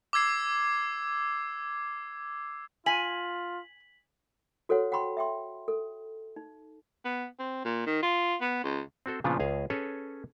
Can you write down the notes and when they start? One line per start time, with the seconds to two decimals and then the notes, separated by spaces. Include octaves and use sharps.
0.13 D6 E6 G#6 C7
2.86 F4 G#5 B6 F#7
4.69 F#4 A4 C5 C#5 F#5
4.92 F#5 G5 B5 C6
5.17 E5 G5 C6
5.68 A4
6.36 D#4
7.05 B3
7.39 C4
7.65 A#2
7.86 D#3
8.02 F4
8.41 B3
8.64 C#2
9.06 C4 F#4 A4 C5
9.24 A#2 C#3 F3 B3 D4 F4
9.40 C#2 G#4 F5 G#5
9.70 C#4 G#4 A4 B4 C#5